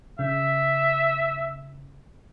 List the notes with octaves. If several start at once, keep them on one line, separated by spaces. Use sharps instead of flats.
C#3 E5